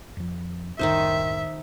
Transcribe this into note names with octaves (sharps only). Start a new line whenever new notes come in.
F2 F3
C2 F#2 A2 D#3 D#4 C5 E5